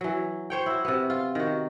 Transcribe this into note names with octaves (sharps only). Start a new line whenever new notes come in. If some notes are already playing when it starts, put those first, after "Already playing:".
E3 F#3
C5 C#5 G5
E4 F#4
C3 B3
F4
D#3 F#4